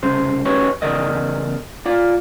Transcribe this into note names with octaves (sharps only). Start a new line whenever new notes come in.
C2 C#3 C5
C#4 F#4 G4 B4 C#5
E2 C#3 A#4 D5 D#5
F4 D5